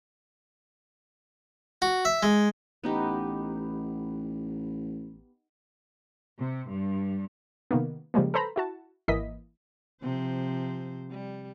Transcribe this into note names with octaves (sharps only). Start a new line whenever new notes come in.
F#4
E5
G#3
A1 B3 D#4 G4
C3
G2
C3 D#3 A#3 B3
C#3 F3 G3 G#3 A#3
A4 B4 C5 A#5 B5
E4 F#4 A5
G#1 E3 A#3 E4 D#5 B6
C3 F3 C5
G3